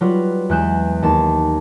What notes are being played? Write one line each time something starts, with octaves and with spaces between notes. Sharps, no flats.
F#3 G3 F4 B4
E2 G#3 F#6 G6 E7
D#2 A5